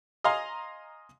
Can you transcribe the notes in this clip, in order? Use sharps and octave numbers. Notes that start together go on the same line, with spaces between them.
D#5 F5 G#5 A#5 C6